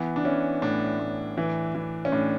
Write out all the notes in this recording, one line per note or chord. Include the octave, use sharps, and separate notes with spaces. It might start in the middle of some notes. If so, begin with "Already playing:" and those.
Already playing: E3 B3
D4
E3 C#4
A2 D4
A2
E3
E3
C#4
A2 D4